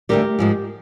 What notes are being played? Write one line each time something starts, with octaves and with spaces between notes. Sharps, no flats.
D2 D3 G3 G4 A#4
G#2 F3 G#3